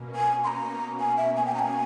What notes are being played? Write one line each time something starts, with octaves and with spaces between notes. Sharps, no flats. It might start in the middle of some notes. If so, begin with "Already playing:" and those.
Already playing: B2 A#3 C#4
G#5
C6
A#5
G#5
E5
G#5
G5
A#5
G#5